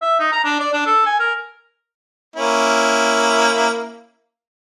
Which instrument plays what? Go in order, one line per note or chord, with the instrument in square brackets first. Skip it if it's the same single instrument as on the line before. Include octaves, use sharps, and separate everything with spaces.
[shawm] E5
D#4
A#5
D4
D5
D4
A4
G#5
A#4
[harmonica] A#3 C#4 E4